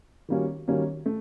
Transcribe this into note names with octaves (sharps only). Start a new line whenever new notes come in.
D#3 G3 A#3 C#4 F#4
D#3 G3 A#3 C#4 F#4
A3